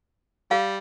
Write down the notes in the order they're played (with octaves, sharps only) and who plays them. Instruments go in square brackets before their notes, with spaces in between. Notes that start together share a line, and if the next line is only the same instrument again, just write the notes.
[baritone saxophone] G3 [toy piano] F5